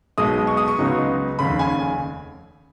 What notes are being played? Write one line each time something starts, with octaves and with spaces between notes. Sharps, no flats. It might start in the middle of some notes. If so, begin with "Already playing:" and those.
B1 B2 G#3 D#4 D#6
C#6
D#6
C#6
C#2 C#3 F#3 B3 D#4
F1 D#2 C#3 B5
G#5